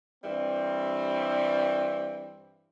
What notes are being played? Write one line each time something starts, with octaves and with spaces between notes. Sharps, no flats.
G2 E3 G3 C4